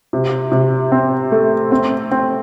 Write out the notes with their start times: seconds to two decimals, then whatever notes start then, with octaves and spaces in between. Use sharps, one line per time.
0.13 C3
0.52 C3
0.92 C4
1.32 A3
1.72 C4
2.11 C4